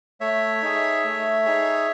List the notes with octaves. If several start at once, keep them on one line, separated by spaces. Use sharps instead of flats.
A3 C#5 E5
D#4 G#4
A3
D#4 G#4